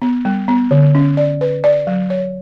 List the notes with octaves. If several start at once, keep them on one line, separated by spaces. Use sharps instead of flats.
B3
G3
B3
D3
C#4
D5
B4
D5
F#3
C#5